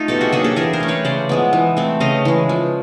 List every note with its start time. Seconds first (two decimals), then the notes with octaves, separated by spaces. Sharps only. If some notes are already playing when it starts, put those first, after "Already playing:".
Already playing: A3 D#4 F4
0.08 B2 G4 A4
0.21 F#4 G#4
0.32 F#3 A#3 D4 F#4 G#4
0.44 G4 A4
0.56 E3 G#4 A#4
0.73 A#4 C5
0.80 A3 C#4
0.88 B4 C#5
1.04 C#3 C5 D5
1.29 F3 G#3 B3
1.53 E3
1.77 A3 C4
2.00 C#3 D#5 F5
2.25 E3 G#3
2.49 F3